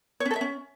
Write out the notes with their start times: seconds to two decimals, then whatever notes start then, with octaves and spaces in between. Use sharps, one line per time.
0.20 C#5
0.25 C#4
0.31 A4
0.36 E5
0.41 C#4